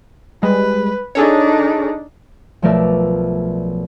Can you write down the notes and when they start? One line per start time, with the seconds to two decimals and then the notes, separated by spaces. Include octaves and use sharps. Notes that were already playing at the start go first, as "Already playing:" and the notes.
0.43 G3 G#3 B4
1.15 D4 D#4 G#4 A4 C#5
2.62 B1 F3 A3 A#4 D5 E5